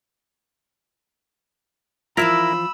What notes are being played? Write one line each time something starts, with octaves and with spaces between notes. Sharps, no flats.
E3 F3 E4 F4 A#4 A#5 B5 E6